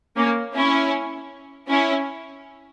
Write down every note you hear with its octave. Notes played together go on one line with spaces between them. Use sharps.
A#3 C#4
C#4 E4
C#4 E4